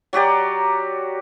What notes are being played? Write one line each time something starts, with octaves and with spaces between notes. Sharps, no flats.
F#3 F#4 G4 D5